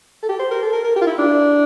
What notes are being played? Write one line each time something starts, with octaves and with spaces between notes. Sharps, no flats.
A4
G4
C5
A#4
A4
A#4
A#4
G4
F4
E4
D4